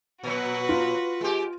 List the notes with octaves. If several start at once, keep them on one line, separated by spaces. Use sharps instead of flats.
A#2 F#3 F#4 B4
F4
G#3 G4